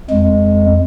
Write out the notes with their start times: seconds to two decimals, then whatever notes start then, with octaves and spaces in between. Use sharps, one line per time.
0.11 F2 G#3